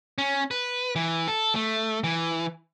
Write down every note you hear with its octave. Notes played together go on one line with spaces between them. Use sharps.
C#4
B4
E3
A4
A3
E3